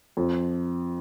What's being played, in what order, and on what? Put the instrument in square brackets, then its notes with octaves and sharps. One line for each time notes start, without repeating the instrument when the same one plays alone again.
[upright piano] F2